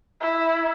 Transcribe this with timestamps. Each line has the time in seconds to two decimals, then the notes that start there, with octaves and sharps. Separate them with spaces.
0.21 E4